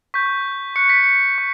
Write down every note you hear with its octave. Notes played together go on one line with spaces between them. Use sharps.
C#6 G6 B6
C#6 F#6 C#7
B6
C#7
C#6